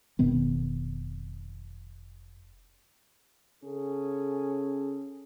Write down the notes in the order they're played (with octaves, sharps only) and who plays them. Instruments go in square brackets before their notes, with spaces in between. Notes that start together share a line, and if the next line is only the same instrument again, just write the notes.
[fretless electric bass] F1 B2 D#3 B3
[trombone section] C#3 C#4 G#4 A4